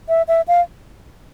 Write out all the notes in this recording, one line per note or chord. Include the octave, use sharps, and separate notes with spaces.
E5
E5
F5